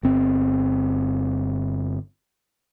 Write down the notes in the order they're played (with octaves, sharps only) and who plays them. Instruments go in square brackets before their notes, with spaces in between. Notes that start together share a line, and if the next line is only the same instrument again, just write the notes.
[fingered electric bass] G1 C4